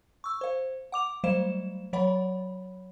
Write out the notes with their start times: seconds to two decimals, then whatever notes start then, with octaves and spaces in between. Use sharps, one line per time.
0.24 C#6 E6
0.41 C5 F5
0.92 F#5 D6 F7
1.24 F#3 G3 A3 C5 F5 E7
1.93 F#3 C#5 F#5 B5